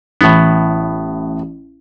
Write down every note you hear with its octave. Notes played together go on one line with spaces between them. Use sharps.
A1 A2 B3